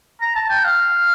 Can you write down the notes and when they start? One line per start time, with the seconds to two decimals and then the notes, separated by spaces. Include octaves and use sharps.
0.22 A#5
0.36 A5
0.50 G5
0.65 F5